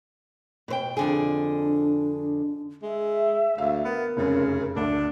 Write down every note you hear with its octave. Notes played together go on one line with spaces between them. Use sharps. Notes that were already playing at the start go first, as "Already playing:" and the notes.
B2 C5 G5
F2 D3 D4 G#4
G#3 E5
D2 F5
B3 A#4
F1 F#2 C#3
D2 D4